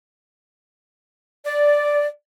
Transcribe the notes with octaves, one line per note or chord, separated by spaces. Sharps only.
D5